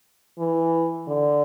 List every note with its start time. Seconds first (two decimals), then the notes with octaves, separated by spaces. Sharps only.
0.39 E3
1.08 D3